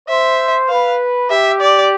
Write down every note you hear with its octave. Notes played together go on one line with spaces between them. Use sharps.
C5 E5
B4 F5
G4 E5
D5